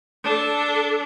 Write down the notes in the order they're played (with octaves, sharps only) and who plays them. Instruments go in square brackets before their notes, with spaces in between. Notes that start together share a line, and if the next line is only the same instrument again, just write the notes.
[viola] D4 A4